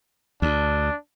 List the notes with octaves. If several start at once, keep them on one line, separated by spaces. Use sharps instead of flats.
D2 D4